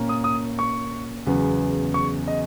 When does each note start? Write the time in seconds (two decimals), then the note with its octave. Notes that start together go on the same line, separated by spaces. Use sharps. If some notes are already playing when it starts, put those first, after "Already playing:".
Already playing: A#2 A#3 C#4
0.09 D#6
0.24 D#6
0.59 C#6
1.26 E2 C#3 F#3 B3
1.94 C#6
2.28 D#5